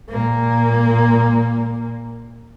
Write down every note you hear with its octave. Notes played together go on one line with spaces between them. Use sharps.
A#2 A#3